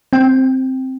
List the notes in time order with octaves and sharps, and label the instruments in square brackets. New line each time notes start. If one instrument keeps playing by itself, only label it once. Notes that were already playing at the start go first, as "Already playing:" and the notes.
[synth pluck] C4 G5